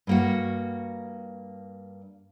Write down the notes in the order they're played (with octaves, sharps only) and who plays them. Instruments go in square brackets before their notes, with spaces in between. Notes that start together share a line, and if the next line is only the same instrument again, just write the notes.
[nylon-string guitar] G2 A#3 F#4